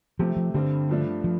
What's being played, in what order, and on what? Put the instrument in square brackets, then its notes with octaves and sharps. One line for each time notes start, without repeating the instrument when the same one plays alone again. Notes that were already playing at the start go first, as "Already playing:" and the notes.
[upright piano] C3 A3 C4 G4 [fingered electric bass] F3
[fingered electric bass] F3
[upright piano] G2 G3 C4 [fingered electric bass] D3
[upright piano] G2 F3 A3 D4
[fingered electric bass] F3